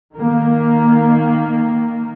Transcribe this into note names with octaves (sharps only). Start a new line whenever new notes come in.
D#3 A#3